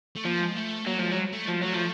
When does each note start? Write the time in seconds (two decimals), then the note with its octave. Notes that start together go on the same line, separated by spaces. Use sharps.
0.16 A3
0.25 F3 A#3
0.40 G#3
0.56 A3
0.86 F#3 A#3
0.97 F3 A3
1.07 F#3 G#3
1.33 A3
1.48 F3
1.61 F#3 A3
1.73 F3